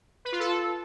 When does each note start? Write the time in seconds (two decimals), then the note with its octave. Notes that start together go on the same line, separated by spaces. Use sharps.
0.25 B4
0.32 F4
0.40 A4